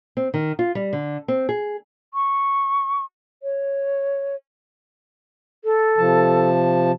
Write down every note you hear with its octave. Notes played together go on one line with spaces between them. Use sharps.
C4
D#3
F4
G3
D3
C4
G#4
C#6
C#5
A4
C3 F3 A5